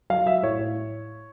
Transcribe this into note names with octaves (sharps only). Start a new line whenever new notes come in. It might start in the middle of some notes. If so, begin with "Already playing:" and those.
F#3 F5
F#3 E5
A2 C#5
A2